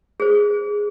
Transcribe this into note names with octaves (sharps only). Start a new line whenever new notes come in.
G#4 C5